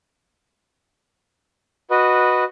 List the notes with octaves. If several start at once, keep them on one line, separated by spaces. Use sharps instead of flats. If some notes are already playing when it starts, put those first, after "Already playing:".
F#4 B4 D#5